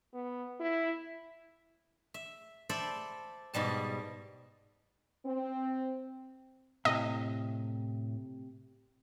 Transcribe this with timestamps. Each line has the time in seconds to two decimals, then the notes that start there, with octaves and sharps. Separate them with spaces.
0.14 B3
0.60 E4
2.14 E5
2.69 A4 C5 D5 E5 B5
3.54 G#2 B2 G3 A5
5.26 C4
6.85 A2 C3 A3 D#5